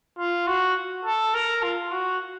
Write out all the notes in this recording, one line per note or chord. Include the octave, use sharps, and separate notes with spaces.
F4
F#4
A4
A#4
F4
F#4